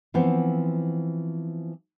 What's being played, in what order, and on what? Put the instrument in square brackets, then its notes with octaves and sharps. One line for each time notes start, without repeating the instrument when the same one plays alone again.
[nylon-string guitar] E3 F3 B3 C4